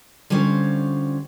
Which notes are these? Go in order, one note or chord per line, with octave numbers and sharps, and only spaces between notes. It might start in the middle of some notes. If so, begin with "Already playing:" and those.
D3 G3 C#4 F4 C5 C#5